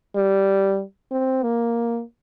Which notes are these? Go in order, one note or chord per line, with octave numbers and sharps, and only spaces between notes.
G3
C4
A#3